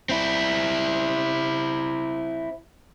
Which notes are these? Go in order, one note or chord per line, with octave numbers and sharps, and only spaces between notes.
C4 E4